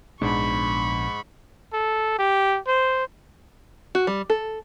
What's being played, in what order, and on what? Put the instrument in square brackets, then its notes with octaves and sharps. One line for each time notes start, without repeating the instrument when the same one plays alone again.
[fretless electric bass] A#1 B3 D4 [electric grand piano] G#2 [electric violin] B5 C#6
[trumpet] A4
G4
C5
[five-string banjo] F#4
G3
A4